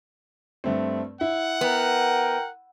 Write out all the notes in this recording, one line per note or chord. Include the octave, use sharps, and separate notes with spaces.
G2 A3 C4
E4 F#5
B3 A#4 G5